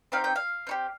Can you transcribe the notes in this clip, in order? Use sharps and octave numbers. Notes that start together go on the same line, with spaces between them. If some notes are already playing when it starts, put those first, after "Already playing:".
C4 D#4 G4 F5
G5
F5
C4 D#4 G4